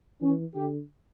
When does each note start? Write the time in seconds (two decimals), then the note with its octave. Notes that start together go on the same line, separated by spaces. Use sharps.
0.22 E3 C#4
0.55 D3 G4